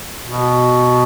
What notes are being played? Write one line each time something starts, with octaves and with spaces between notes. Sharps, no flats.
B2